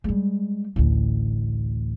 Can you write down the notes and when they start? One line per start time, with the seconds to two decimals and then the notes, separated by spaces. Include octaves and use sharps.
0.04 G3 G#3
0.76 A1 D2